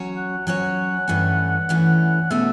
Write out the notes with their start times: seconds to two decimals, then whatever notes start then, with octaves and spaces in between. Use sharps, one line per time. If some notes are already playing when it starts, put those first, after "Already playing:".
Already playing: F#3 C#4 F#4 C#5
0.16 F#5
0.47 F#3 C#4 F#4 C#5 F#5
1.08 G2 E3 A3 C#4
1.69 G2 E3 A3 C#4
2.30 B2 A3 C#4 F#4 E5